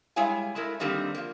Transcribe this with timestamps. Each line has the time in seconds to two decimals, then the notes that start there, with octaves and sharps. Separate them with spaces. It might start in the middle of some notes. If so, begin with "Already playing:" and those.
0.16 G3 G#3 E4 C#5 F5 G#5
0.55 G#3 A3 E4 A#4
0.80 D3 D#3 G3 A#3 C4 D#4
1.15 F3 A#3